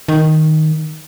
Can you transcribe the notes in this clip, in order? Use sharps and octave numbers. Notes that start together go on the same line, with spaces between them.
D#3